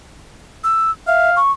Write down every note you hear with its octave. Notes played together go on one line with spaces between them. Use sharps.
E6
E5 F5
C#6